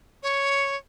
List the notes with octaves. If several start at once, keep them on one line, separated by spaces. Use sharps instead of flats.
C#5